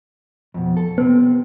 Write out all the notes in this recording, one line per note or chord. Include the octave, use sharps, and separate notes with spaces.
F2 B2
A4
C3 B3 C4